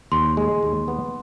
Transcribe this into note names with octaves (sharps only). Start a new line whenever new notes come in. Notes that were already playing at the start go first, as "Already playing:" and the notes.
D#2 C6
G#3
D#2
B3